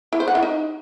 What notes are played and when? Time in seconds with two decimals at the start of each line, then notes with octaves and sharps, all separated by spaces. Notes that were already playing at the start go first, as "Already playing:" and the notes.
0.13 E4
0.20 C5
0.28 F#5
0.35 E4
0.43 D#4